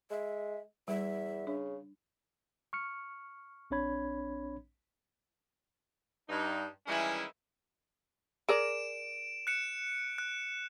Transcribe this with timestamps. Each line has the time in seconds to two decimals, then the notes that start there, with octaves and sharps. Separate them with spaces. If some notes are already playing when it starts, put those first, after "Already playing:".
0.10 G#3 E5
0.88 E2 G3 E5
1.47 C#3 D4
2.73 C#6 F6 C#7
3.70 A#1 C4 D4 C#5 B5 G#6
6.29 G2 D#4
6.87 D#3 E3 G3 G#3 C#4 E4
8.49 G#4 A#4 D5 D7 E7
9.47 F#6 C#7 E7
10.18 F#6